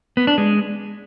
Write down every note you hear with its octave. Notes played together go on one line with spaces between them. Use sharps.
B3
D4
G#3